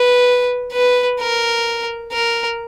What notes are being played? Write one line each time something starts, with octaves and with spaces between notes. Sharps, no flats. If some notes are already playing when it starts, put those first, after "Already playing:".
Already playing: B4
B4
A#4
A#4